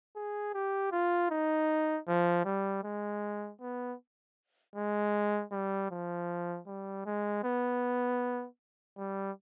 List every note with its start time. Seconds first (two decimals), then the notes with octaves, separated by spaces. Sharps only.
0.16 G#4
0.54 G4
0.92 F4
1.30 D#4
2.08 F3
2.45 G3
2.84 G#3
3.61 B3
4.75 G#3
5.52 G3
5.91 F3
6.66 G3
7.06 G#3
7.44 B3
8.97 G3